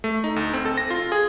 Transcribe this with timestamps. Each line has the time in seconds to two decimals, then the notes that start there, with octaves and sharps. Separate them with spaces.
0.04 A3
0.24 D#4
0.36 D2
0.53 C4
0.65 A4
0.77 A#6
0.90 F4
1.12 G#4